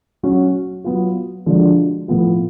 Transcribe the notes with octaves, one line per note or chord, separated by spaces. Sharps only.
F#3 C#4 F#4
F#3 B3 F4
D3 F3 G#3 D4 F#4
A2 F3 B3 F4